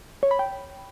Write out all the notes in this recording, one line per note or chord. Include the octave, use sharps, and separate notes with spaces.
C#5
B5
G5